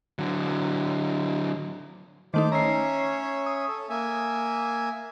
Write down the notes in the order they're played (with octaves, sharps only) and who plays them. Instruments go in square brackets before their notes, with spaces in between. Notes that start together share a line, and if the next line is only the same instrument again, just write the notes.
[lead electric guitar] D3 F#3
[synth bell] D#3 A3 D#4 [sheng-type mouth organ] C5 D6
[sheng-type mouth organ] C#4 C#5 E5 [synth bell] A#5 C7
[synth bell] D#6
[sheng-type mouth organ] A4
A#3 E5 G#5